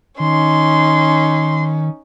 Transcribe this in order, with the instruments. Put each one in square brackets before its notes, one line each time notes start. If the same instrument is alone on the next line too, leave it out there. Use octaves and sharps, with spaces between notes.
[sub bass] D#3 [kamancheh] C#4 D#4 [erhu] C6